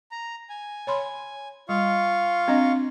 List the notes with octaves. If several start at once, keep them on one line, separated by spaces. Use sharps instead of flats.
A#5
G#5
C#5 B5 C6
G3 F4 F5 C#6
C4 D4 D#5